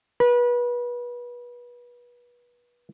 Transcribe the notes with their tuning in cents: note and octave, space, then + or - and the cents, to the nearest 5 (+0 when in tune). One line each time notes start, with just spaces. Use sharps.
B4 -30